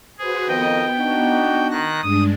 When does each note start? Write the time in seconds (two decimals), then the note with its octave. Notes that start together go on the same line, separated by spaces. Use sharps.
0.18 F#4 G#4 B4 C5
0.48 F2 D#3 B3 D#5 G5
0.97 D4 D#4 F#4
1.71 D#3 F#6 A#6
2.02 G2 G#3 D4 D#6